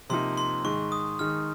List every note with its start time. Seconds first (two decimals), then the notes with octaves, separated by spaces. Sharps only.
0.10 C3 F3 A#3 D#4 C6
0.37 C6
0.64 G#2 D#3 G#3 D#4 C#6
0.92 D#6
1.19 D#3 G#3 D#4 F6